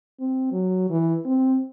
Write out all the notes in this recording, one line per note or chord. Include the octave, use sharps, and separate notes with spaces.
C4
F#3
E3
C4